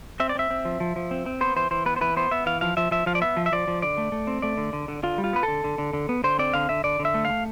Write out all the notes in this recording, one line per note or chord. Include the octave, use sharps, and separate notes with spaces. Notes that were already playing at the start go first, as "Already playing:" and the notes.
C4 E5
D5
C4 E5
C4
F3
F3
F3
C4
C4
B3 C5
E3 C5
E3 C5
B3 B4
C5
E3 B4
B3 C5
B3 E5
E3 F5
F3 F5
F3 E5
F3 E5
F3 F5
D5
B3 E5
F3
E5
F3 D5
F3
D3 D5
A3
A3
C4
A3 D5
D3
D3
D3
D3 F4
G3
F4
B3 B4
D3 A4
D3
D3
D3
B3
D3 C5
C4 D5
D3 F5
D3 E5
D3 D5
D3
E5
A3
A3 F5